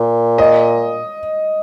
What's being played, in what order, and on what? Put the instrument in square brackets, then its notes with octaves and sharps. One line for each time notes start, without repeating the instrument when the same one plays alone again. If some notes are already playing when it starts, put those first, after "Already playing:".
Already playing: [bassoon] A#2
[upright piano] D#5